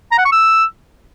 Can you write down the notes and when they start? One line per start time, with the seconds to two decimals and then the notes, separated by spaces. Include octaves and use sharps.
0.11 A#5
0.18 F#5
0.25 C#6
0.32 E6